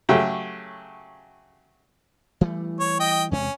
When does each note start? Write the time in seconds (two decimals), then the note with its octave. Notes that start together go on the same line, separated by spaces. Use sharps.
0.09 C#3 F#3 A3 G4
2.41 E3 G3 A3
2.80 C#5
3.00 D#5 G5
3.31 E2 C3 G#3 C#4